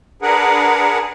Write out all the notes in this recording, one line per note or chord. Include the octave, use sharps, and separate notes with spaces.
D4 G#4 A#4 B4 F#5